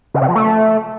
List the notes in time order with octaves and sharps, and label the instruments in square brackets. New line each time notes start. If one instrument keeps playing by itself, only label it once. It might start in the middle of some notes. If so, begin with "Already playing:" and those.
[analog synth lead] C#3
C3
F3
A3